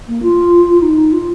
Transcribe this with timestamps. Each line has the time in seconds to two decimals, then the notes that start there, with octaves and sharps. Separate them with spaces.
0.08 A#3
0.22 F4
0.82 D#4
1.12 F4